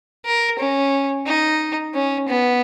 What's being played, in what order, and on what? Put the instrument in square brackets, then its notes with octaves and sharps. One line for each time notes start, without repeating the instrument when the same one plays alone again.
[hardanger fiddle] A#4
C#4
D#4
C#4
B3